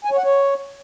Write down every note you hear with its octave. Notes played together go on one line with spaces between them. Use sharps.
G#5
C#5
F#5
C#5